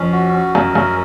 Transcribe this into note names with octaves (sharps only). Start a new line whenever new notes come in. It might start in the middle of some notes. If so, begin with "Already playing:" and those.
Already playing: F2 C#4
F#4
C#4
F#2 A#4
F#2 C#4